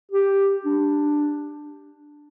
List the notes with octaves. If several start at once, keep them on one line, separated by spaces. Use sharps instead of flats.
G4
D4